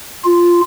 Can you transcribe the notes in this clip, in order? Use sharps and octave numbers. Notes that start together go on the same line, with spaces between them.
F4